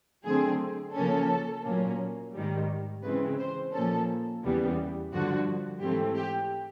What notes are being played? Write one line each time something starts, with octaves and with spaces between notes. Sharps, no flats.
D3 F#3 A3 C4 G#4
C#3 F3 A#3 C#4 A4
A#2 F#3 A#3 C#4
G#2 D#3 G3
C#3 E3 G#3 C4 B4
C5
A#2 F3 A#3 C#4 A4
E2 C#3 E3 G3 B3
G2 D3 F3 F#4
G#2 E3 A3 C4 G4
G4